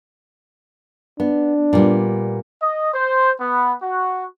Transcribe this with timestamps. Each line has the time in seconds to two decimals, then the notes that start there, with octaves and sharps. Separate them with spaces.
1.20 B3 D4
1.73 A#2 G3 B3
2.61 D#5
2.94 C5
3.39 B3
3.83 F#4